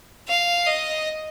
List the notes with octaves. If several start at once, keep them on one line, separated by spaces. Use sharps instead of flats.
F5
D#5